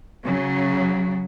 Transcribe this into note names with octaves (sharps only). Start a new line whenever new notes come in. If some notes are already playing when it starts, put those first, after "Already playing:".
C#3 F#3